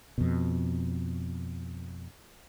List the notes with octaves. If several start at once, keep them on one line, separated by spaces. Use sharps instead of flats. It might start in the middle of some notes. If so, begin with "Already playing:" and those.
F2 B2